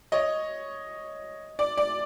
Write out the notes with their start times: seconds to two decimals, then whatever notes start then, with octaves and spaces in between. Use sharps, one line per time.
0.12 C#5 D#5
1.59 D5
1.77 D5